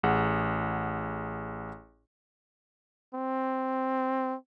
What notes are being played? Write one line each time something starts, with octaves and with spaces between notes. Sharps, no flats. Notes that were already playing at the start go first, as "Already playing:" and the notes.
A1 G#4 F#5
C4